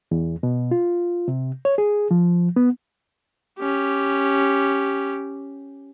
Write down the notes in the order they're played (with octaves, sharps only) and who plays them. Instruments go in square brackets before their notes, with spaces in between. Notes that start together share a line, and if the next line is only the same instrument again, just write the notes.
[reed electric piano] E2
B2
F4
C3
C#5
G#4
F3
B3
[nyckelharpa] C#4 G4